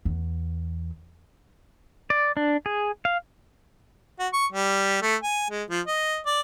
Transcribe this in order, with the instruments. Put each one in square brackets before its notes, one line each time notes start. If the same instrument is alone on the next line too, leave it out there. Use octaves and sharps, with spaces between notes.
[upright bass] E2
[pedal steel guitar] D5
D4
G#4
F5
[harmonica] F#4
C#6
G3
A3
G#5
G#3
F3
D#5
D5